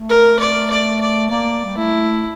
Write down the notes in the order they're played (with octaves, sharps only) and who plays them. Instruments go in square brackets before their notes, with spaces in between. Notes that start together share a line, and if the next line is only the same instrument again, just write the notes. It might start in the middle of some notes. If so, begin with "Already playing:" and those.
Already playing: [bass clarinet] A3
[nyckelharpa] A#4
D5
D5
D5
[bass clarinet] A#3 [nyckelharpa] D5
[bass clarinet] G3
[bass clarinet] A3 [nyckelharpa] E4